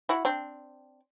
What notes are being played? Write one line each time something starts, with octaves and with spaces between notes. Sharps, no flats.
E4 F#4
C4 D4